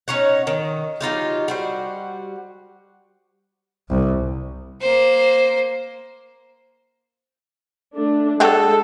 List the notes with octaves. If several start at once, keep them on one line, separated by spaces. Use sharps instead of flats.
C#4 D#4 C#5 F#5
D#3
F#3 D#4 F4 G4
G3 F#4 C5
C2
A#3 C5
A3 D4
G#3 D4 F#4 G4 A4